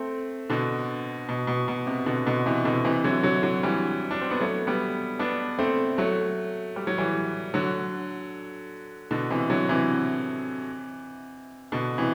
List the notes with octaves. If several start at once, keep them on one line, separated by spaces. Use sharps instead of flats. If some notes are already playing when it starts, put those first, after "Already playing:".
Already playing: A3 C4
B2 D3
B2
B2
B2
C3
B2 D3
B2 D3
C3 E3
B2 D3
C3 E3
D3 F#3
D3 F#3
D3 F#3
E3 G3
D4
C4
B3
F#3 A3
G3 B3
B3 D4
A3 C4
F#3 A3
G3
F#3
E3 G3
D3 F#3
B2 D3
C3 E3
D3 F#3
C3 E3
B2 D3
C3 E3